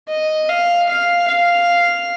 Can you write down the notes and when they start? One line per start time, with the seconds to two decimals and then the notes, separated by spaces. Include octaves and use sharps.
0.09 D#5
0.49 F5
0.89 F5
1.28 F5